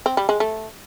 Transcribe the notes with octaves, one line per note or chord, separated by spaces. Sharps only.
C4
G3
G#3
A3